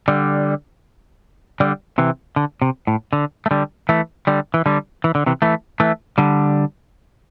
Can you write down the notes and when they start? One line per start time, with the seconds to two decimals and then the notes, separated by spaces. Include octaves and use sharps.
0.08 D3 G3
1.60 D3 G3
1.98 C3 E3
2.36 D3
2.62 C3
2.87 A2
3.13 D3
3.46 A3
3.51 D3 G3
3.89 E3 A3
4.27 D3 G3
4.54 E3
4.66 D3 G3
5.04 E3
5.15 D3
5.26 C3 E3
5.42 E3 A3
5.80 E3 A3
6.18 D3 G3